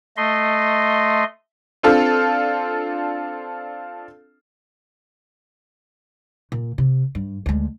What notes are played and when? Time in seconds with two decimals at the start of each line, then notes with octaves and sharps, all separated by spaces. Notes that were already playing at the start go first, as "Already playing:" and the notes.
0.17 A3 D#5 C6
1.83 C4 D4 F4 A4 F6
6.52 A#2
6.78 C3
7.15 G2
7.46 D2 G#3